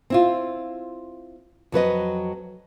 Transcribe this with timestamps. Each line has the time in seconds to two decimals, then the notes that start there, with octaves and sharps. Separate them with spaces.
0.10 C4 E4 F4
1.72 F2 F#3 B4 D#5